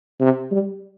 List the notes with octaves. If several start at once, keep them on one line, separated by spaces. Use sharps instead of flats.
C3
G3